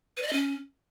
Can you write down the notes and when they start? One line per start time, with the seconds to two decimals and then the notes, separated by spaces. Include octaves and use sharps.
0.17 B4
0.22 D5
0.28 D#5
0.33 C#4